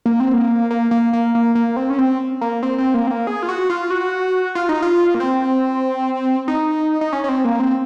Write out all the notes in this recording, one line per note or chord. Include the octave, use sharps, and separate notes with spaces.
A#3
C4
A#3
A#3
A#3
A#3
A#3
A#3
C4
C#4
C4
A#3
C4
C4
A#3
C4
A#3
G#4
F4
F#4
F4
F#4
F4
D#4
F4
A#3
C4
D#4
D#4
C#4
C#4
C4
A#3
C4